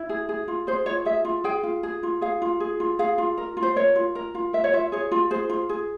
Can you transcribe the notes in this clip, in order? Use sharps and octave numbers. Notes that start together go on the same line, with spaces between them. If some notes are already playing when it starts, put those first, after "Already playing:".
Already playing: E4
G#4
G#4
F4
G#4 C5
F4 C#5
G#4 E5
F4
G#4 G5
F4
G#4
F4
G#4 F5
F4
G#4
F4
G#4 F5
F4
A#4
F4
C5
A#4 C#5
F4
A#4
F4
A#4 E5
C#5
F4 E5
G#4 C#5
F4
G#4 C5
F4
G#4